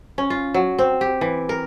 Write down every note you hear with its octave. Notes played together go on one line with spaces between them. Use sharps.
C#4
F4
F#3
C4
G4
E3
A#4